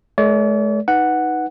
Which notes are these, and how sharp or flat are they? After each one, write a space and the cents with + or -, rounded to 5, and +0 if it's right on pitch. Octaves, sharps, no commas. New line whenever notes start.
G#3 +45 A#4 +5 D5 -45
D#4 +10 B4 +0 F#5 +0